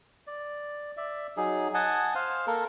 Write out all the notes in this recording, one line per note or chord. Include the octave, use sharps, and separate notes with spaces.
D5
D5 E5
F#3 D#4 G#4
D#5 F#5 G#5 A5
C5 F5
A#3 A4 A#4